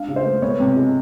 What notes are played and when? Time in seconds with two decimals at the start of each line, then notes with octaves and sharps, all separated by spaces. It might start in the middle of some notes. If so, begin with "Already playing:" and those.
Already playing: D4 F5
0.08 C#3
0.16 C5
0.25 A3
0.42 B3 C#5
0.60 C3
0.76 G#3